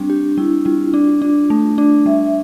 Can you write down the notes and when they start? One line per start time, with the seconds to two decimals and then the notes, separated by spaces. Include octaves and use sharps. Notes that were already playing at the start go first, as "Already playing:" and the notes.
Already playing: G3 C4 D4
0.10 G4
0.38 G3 E4
0.65 G3 F4
0.94 D4
1.22 D4
1.50 A3
1.78 D4
2.06 G3 E5